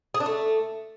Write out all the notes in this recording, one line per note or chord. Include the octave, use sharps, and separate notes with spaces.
G#4
D4
A3